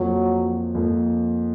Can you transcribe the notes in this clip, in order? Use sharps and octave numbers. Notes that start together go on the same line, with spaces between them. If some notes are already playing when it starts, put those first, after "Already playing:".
Already playing: F2 F3 F#3 A#3
F2 F3 A#3